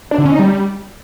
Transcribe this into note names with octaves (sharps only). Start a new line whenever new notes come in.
D4
D3
C#4
D#4
G3